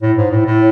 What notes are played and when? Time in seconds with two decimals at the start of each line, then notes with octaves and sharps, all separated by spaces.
0.02 A2
0.17 G#2
0.31 A2
0.46 A2